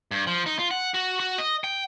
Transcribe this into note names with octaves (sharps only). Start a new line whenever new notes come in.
G2
F3
D#4
F4
F#5
F#4
F#4
D#5
G5